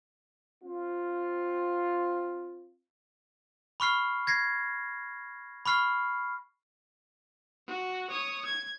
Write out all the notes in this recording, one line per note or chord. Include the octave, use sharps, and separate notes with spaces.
C4 F4
B5 C#6 F6 C7
G#6 A#6 C7
B5 C#6 F6 C7
F#4
C#5 D#6
G#6